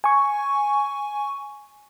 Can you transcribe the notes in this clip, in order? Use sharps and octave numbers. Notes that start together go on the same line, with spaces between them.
G#5 C#6